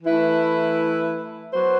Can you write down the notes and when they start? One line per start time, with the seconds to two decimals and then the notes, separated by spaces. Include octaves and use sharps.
0.03 E3 A3 E4 B4
1.52 F#3 B3 F#4 C5